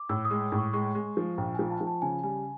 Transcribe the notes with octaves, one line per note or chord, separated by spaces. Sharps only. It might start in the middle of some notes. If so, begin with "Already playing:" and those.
Already playing: D6
A2 E6
D#6
G#3
A2
C#6
G#3 C#6
G#3
F3
A#1 G5
F3 G#5
A5
F3
A5
C#3 G#5
G3 G#5